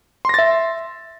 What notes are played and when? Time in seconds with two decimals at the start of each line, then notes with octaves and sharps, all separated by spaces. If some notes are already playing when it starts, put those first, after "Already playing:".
0.25 C6
0.29 A#6
0.34 A6
0.38 E5